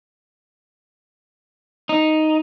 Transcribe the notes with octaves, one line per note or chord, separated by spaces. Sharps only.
D#4